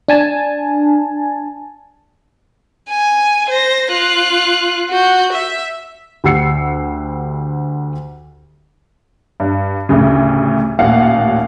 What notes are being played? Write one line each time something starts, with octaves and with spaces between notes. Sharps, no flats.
D4 G#5 A5
G#5
C5 A#6
F4 F#6
F#4 G6
E5
D2 G4 F#5 E6 C7 C#7
G2
A1 D2 C#3
A1 D#2 A#2 F5 F#5